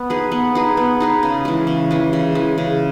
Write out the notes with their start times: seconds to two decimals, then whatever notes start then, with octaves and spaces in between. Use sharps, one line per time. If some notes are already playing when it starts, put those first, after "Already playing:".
Already playing: B3
0.10 D#4 G#4 B4
0.32 B3
0.55 D#4 G#4 B4
0.77 B3
1.00 D#4 G#4 B4
1.23 C#3
1.45 E3 G#3
1.67 C#3
1.91 E3 G#3
2.13 C#3
2.35 E3 G#3
2.58 C#3